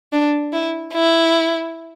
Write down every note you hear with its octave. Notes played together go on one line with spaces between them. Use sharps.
D4
E4
E4